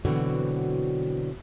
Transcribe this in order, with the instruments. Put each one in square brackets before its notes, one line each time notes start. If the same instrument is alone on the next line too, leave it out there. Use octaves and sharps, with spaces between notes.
[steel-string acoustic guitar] B2 D3 E3 F#3 C4 F#4